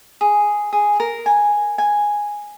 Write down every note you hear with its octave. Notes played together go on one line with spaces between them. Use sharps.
G#4
G#4
A#4
G#5
G#5